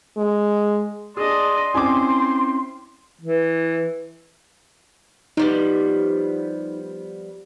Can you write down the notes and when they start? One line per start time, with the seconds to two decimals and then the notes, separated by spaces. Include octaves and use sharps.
0.17 G#3
1.17 D4 G#4 D#5 C6
1.74 C4 C#4 E4 C5 G#5 D6
3.21 E3
5.37 F3 G3 B3 D#4